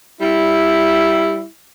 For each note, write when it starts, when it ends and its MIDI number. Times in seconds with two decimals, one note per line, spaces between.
0.21 1.45 55
0.21 1.45 64